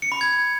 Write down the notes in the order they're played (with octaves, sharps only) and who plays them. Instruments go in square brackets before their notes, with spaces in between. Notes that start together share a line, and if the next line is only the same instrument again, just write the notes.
[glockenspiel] C#7
B5
G#6